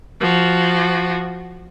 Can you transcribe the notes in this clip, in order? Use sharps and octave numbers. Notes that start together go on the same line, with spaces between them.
F3 F#4